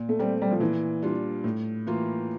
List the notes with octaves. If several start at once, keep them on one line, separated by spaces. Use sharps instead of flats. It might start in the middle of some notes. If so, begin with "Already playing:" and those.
Already playing: A#2
A3
G3 A3 C4
G3
F3
A#2 E3
G3 D4 F4
A2
E3 A#3 F4